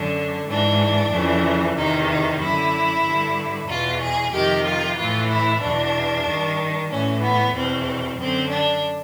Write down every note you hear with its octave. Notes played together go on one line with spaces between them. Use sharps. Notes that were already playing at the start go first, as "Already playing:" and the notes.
Already playing: F#2 D3 D4
G#2 E3 D4
F2 C#3 E3
E2 C3 D#3 D#4
D#4
F#2 D3 E4
G2 D3
E2 B2 F4
G#4
F2 C3 D#3 G4
F4
E3 F4
A2
E4
E2 B2 D4
G2 D#3
A2 E3 C#4
B3
E2 B2 C4
F#2 D3 C4
D4